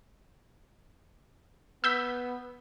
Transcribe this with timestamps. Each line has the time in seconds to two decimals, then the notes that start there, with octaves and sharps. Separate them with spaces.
1.84 B3 E6 G6 B6